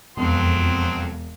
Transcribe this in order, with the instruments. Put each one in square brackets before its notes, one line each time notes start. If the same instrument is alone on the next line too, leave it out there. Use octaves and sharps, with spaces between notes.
[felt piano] E1 [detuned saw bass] F2 [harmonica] F#3 C4 C6